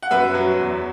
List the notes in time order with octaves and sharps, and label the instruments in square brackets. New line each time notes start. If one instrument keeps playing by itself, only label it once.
[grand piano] F#5
F#2 B4 E5
F#3
E2